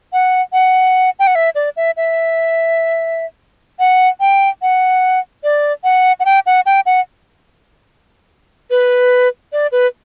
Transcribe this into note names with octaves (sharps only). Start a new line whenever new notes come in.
F#5
F#5
G5
F#5
E5
D5
E5
E5
F#5
G5
F#5
D5
F#5
F#5
G5
F#5
G5
F#5
B4
D5
B4